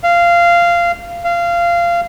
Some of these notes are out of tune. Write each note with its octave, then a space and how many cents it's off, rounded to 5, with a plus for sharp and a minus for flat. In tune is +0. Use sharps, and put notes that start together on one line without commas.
F5 -15
F5 -20